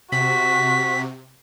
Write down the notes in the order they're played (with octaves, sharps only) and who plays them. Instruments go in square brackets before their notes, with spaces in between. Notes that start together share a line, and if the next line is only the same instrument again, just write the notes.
[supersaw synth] C3 [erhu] F#4 [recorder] B6